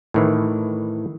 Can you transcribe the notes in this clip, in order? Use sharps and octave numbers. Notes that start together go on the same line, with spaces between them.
A2 D#3 E3